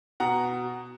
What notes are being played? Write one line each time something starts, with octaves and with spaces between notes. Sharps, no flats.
B2 F#5 A#5